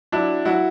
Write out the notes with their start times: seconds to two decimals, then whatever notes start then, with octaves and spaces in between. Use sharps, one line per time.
0.12 F#3 D4 E4
0.45 F#3 E4 F#4